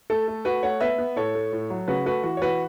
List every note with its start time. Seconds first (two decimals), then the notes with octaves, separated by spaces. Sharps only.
0.10 A3 A4
0.28 A3
0.45 A3 F#4 B4
0.63 A3 C#5 F#5
0.81 B3 B4 E5
0.98 B3
1.16 A2 A4 C#5
1.35 A3
1.53 A2
1.70 F#3
1.88 C#3 F#4 B4
2.06 A3 F#4 B4
2.23 E3 F#4
2.37 C#5
2.42 E3 F#4 B4